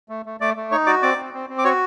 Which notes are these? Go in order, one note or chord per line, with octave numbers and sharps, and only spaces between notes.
A3
A3
A3 D5 D6
A3
D#4 C#5 C#6
F#4 D5 D6
C4 D5 D6
C4
C4
C4
D6
F#4 C#5 C#6